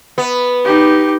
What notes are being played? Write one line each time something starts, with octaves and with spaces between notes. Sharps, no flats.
B3
D#4 G4